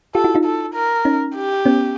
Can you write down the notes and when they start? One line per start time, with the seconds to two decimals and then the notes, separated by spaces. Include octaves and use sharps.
0.15 F4 G4 A4
0.24 E4 F#4
0.35 D#4 F4
0.45 A4
0.75 A#4
1.05 C#4 D#4
1.35 G4
1.66 B3 C#4